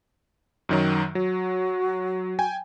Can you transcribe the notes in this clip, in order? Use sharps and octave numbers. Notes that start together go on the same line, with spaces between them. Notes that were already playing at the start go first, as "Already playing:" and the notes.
F#2 D#3 F#3
F#3 F#4
G5 G#5